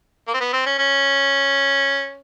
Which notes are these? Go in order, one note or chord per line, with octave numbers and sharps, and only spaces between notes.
A#3
C4
B3
C4
C#4
C#4